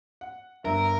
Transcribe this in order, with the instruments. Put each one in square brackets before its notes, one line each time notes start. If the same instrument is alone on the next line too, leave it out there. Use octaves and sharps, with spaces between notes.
[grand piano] F#5
[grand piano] G1 G2 [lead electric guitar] A#4 [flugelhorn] E5